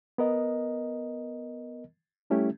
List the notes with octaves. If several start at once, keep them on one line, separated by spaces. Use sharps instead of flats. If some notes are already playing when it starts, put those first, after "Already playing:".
B3 A#4 D#5
G3 A3 C#4 E4 G4